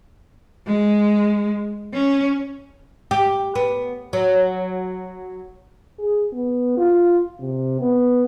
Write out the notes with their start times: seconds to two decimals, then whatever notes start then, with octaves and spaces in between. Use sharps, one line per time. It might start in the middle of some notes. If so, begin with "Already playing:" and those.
0.67 G#3
1.94 C#4
3.11 G4
3.55 B3
4.13 F#3
6.00 G#4
6.32 B3
6.78 F4
7.40 C3
7.81 B3